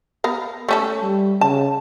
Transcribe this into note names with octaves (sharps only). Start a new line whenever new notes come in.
B3 A#4 F5
A3 C#4 A4
G3
C#3 A5